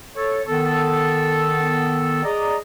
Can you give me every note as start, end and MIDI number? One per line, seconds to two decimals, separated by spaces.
0.16 0.42 69
0.16 0.42 73
0.47 2.22 51
0.47 2.22 59
0.47 2.22 69
2.24 2.56 68
2.24 2.56 74
2.24 2.56 75
2.24 2.56 82